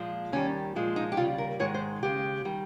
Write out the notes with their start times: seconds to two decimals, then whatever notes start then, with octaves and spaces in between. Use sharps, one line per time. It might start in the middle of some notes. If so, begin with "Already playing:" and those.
Already playing: A#2 F3 G#3
0.32 D#2 D#3 G3 C#4
0.76 A#2 F3 G#3
0.96 D#4
1.12 G4
1.17 D#2 C#3 G3 F4
1.38 A#4
1.59 G#2 D#3 G#3 C#5
1.74 C5
2.03 D#2 C#3 G#3 G4
2.45 D#3 G3